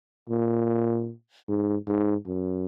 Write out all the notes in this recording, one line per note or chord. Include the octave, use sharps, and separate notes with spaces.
A#2
G#2
G#2
F#2